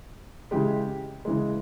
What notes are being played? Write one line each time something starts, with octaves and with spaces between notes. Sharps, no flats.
C#3 E3 G#3 G4
C#3 E3 G#3